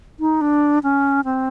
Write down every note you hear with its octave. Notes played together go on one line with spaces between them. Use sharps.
D#4
D4
C#4
C4